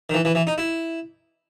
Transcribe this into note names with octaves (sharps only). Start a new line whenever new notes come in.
D#3
E3
E3
E3
D#4
E4